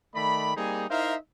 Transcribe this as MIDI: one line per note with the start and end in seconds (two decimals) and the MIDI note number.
0.15 0.52 51
0.15 0.52 57
0.15 0.52 74
0.15 0.52 83
0.56 0.85 55
0.56 0.85 58
0.56 0.85 60
0.56 0.85 63
0.56 0.85 68
0.90 1.16 63
0.90 1.16 64
0.90 1.16 70
0.90 1.16 72
0.90 1.16 76
0.90 1.16 77